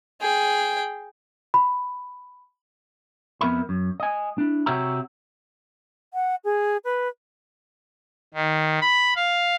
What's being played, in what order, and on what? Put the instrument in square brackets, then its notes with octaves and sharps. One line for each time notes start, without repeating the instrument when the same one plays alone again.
[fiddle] G#4 G5
[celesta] B5
[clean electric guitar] F2 B3 A#4 E5 B5
F#2
D#5 G#5
D4 E4
C3 F#4 G4 C#5 E5 A#5
[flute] F#5
G#4
B4
[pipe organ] D#3
B5
F5